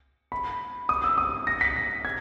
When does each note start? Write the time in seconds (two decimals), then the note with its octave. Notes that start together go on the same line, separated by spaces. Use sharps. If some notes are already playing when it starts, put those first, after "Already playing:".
0.32 B5
0.89 D#6
1.04 E6
1.18 D#6
1.47 A#6
1.61 B6
1.76 A#6
2.05 G#6